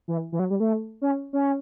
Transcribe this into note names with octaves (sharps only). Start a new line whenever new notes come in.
E3
E3
F#3
G3
A3
C#4
C#4